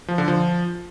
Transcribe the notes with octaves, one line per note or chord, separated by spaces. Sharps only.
F3
D3
F3